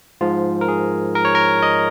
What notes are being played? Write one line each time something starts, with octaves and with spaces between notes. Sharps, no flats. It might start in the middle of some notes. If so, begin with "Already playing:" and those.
G#2 F3 F4
A#4
G#4
A#4
C#5
A#4
D#5